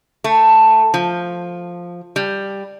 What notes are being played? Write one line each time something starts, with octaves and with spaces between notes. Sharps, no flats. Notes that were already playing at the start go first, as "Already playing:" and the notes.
A3
F3
G3